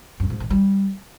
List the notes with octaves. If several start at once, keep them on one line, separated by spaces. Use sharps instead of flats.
F#2
G#2
D#3
G3